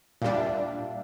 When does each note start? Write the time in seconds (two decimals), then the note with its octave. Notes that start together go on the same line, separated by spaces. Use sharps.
0.22 A#2 G3 D4 F5
0.35 E5
0.46 D5